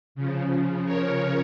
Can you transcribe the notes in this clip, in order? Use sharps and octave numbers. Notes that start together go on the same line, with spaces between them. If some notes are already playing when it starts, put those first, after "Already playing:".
C#3 F3
A#4 C#5